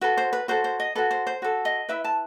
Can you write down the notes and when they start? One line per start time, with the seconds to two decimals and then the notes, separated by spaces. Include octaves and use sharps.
0.01 F#4 A4 B4
0.17 C5
0.33 B4
0.48 F#4 A4 C5
0.64 C5
0.80 D#5
0.95 F#4 A4 B4
1.11 C5
1.27 C5
1.42 F#4 A4
1.65 D#5
1.89 E4 B4 E5
2.04 A5